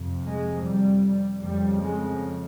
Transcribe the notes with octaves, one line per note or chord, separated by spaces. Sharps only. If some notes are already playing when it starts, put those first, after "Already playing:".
Already playing: F2 C3
G#3
G3
F2 C#3 G3
G#3